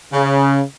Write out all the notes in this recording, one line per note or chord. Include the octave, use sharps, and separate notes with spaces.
C#3